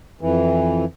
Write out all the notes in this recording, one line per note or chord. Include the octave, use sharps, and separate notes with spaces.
F2 E3